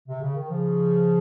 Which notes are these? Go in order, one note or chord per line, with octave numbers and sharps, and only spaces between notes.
C3
C#3
D#3
C#3 F3